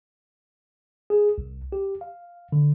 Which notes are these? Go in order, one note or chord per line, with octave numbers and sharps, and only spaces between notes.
G#4
C2
G4
F5
D3